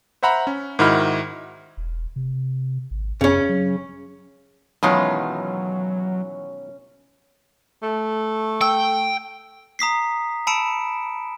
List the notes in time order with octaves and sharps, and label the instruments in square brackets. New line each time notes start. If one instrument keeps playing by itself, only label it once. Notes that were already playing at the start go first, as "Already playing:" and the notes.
[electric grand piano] C5 E5 F#5 A#5 B5
C#4
G#2 D#3 E4 F#4 B5 F6
[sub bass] E1
C3
G#1
[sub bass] F#2 [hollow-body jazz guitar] C#3 C#4
[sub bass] F#3
[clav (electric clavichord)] B2 D#3 G#3 [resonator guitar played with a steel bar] E3 F4 [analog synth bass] F#3 [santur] C#4
[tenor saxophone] A3
[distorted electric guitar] G5 [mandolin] E6
[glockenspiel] A#5 D#6 B6 C7
A5 B5 E6 C#7 D7 E7